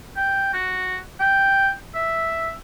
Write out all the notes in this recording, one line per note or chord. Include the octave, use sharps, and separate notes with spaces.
G5
F#4
G5
E5